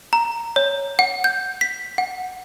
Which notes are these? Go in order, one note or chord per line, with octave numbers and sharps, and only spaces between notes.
A#5
C#5
F#5
G6
B6
F#5